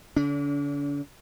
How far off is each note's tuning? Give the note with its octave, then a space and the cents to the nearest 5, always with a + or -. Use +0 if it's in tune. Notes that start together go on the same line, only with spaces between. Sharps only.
D3 -30 D4 -45